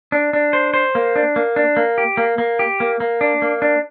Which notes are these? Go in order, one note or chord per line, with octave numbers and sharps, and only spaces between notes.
D4
D4
C5
C5
A#3
D4
A#3
D4
A#3
G4
A#3
A#3
G4
A#3
A#3
D4
A#3
D4